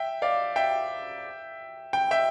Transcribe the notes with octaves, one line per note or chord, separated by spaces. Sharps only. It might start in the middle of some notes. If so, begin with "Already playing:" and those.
Already playing: E5 G5
D5 F5
E5 G5
G5
E5 G5